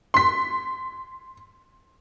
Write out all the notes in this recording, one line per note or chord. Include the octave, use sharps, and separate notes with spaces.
C6 B6